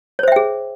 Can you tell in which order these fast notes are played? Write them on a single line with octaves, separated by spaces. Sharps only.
C#5 C5 E5 G5 G#4